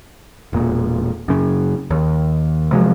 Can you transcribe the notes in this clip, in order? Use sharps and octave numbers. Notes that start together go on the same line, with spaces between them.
E1 A#2
F#2 C#3
D#2
C3 F3 F#3 G#3